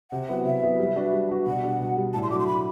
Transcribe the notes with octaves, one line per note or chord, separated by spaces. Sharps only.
C3 F#5
F#3 B3 E4
C3 E5
F#3 B3 E4
G3
D4 F#4 B4
G3
D4 F#4 B4
B2 F#5
G3 D4
B2
G3 D4
A2 A5
C6
F#3 A3 D4 F#4 D6
C6
A2 B5